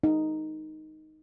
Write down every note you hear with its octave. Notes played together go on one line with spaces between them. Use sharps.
D#4